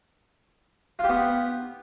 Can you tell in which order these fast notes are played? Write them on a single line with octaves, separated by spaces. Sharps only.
F4 G4 B3